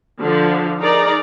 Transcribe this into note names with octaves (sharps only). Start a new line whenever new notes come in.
D3 F3
D#4 G#4 A#4 D5 A#5